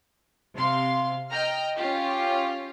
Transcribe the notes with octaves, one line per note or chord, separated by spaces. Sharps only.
C3 F5 C6
D#5 G5 A#5 F6
C#4 F4 G4